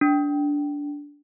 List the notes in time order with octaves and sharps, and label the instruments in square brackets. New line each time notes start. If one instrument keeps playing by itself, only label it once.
[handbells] D4